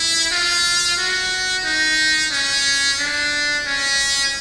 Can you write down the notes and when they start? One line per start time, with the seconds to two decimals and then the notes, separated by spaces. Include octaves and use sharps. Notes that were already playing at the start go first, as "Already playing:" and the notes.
Already playing: E4
0.32 F4
0.99 F#4
1.65 D#4
2.32 C#4
2.99 D4
3.66 C#4